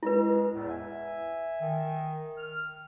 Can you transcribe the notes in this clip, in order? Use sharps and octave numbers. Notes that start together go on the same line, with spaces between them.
G#3 E4 B4
E2 A2
E5 G#5
D#3
F6